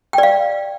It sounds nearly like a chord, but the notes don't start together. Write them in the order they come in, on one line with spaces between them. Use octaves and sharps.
G5 D5 F5